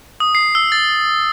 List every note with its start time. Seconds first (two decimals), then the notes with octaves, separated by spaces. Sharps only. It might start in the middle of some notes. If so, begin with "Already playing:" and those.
0.20 D#6
0.35 C7
0.55 E6
0.72 A6